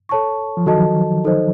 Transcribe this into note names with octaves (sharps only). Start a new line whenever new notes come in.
A4 C#5 A5 C#6
F3
D#3 F#3 F#4 A4 D#5 A5
D#4 A4 C5 D#5